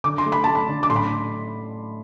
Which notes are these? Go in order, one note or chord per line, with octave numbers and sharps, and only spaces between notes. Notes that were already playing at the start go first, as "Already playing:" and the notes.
D3 D6
C6
A3
B5
A3 A5
B5
D3
D6
A2 C6
B5